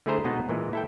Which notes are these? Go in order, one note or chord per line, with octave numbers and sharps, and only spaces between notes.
D3 A3 E4 G#4 C5 A#5
B2 G#3 B3 D#4 D#5
A#2 E3 G#3
E4 A4 G5